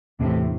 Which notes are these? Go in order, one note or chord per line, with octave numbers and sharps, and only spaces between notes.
E2 A2 C3 E3 A3 D4